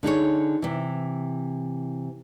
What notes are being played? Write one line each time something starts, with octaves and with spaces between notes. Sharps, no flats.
D3 D#4 G#4 C#5
C3 E3